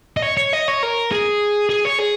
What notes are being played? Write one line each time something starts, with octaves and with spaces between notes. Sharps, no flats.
D#5
C#5
C#5
D#5
C#5
A#4
G#4
G#4
C#5
G#4